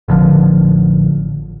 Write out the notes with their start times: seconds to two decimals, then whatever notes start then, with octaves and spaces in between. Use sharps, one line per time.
0.08 A1 D3 F3